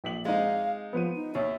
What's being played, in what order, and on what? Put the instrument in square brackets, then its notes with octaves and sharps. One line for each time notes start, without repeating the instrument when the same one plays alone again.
[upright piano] A#1 B6 F#7
[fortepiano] G#3 C4 D#4 [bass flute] F5
[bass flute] F3 [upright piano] B3 C5 D#7
[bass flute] D#4
[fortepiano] D#2 [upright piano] C#5 [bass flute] E5